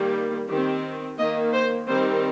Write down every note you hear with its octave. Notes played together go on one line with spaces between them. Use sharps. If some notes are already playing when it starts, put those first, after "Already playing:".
Already playing: D#3 G3 A#3
D#3 C4 G4
D#3 A#3 D#5
C5
D#3 G3 C4 C5